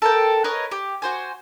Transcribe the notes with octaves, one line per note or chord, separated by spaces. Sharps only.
A4 A#4 G5
A#4 B4 C#5 D#5
G4
F#4 C5 G#5